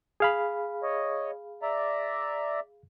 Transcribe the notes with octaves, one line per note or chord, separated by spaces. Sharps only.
G#4 F5 B5
C#5 D#5
D5 E5 A#5